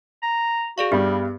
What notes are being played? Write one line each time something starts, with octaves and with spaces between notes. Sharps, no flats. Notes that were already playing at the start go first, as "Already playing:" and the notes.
A#5
F#4 G#4 D5 F5
G2 G3 B3 G4